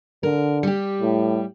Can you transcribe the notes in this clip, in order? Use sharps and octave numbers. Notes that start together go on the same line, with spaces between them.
D3 A#4
G3 G4
A2